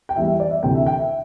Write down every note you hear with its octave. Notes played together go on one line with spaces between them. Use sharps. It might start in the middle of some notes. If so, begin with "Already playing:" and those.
G5
E2 E3 G3 E5
E5
D5
E5
D2 C3 E3 G5
E5
G5
E5